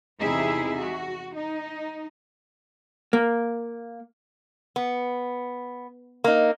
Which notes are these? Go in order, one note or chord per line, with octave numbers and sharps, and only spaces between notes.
E2 C3 D#4 E4 G#4 E5
F#4
D#4
A#3
B3
A#3 D#4